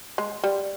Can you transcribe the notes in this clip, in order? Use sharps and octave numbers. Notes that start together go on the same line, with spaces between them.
G#3
G3